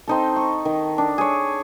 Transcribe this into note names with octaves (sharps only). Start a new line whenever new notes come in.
C4 D#4 A4
C#6
D#3
D4
G#4 C#5